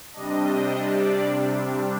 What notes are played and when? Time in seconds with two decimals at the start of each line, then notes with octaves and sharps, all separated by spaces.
0.13 C3 G3 D4 D#5
0.89 D5